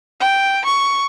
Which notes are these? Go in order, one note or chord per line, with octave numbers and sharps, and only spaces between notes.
G5
C#6